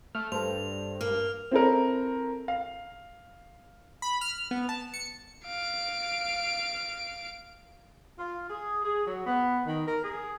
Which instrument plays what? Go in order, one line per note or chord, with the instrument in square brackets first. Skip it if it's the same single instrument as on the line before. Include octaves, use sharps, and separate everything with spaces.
[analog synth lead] A3 [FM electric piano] F6
[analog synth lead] G2 [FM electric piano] A4 C5 [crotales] F7
[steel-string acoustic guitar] A#3 [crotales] F6
[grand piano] C4 E4 A4 A#4
F5
[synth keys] B5
F6
B3
A5
C#7
[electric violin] F5 D7
[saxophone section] F4
G#4
G#4
F#3
B3
D#3
A#4
G#4